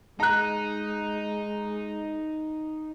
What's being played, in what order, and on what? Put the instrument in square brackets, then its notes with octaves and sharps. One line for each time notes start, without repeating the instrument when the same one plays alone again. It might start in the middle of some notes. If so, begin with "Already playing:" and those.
[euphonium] G#3 [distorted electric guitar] D#4 [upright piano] A#5 F#6